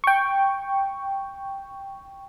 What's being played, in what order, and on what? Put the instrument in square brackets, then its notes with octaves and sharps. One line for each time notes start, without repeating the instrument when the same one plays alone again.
[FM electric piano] G5 C#6